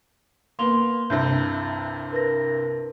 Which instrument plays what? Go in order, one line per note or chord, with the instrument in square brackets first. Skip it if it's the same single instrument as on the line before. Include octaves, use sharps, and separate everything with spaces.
[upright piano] A#3 B3 [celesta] C6 F7 G7
[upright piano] C2 G2 C3 [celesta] G6
[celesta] A#4 B4 A#6